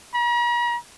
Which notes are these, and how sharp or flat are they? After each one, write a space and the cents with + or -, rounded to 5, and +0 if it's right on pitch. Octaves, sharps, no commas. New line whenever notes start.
A#5 +45